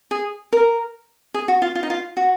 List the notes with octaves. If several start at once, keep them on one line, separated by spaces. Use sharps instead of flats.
G#4
A#4
G#4
F#4
F4
F4
D#4
F4
F#4